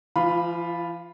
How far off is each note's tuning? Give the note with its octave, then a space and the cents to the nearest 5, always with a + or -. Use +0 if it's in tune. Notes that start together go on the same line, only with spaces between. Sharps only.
F3 -45 F4 +0 B5 +0